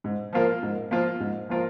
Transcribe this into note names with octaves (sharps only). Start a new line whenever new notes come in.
G#2
F3 A#3 F4 A#4
G#2
F3 A#3 F4 A#4
G#2
F3 A#3 F4 A#4